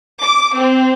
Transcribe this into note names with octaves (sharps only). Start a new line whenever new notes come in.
D6
C4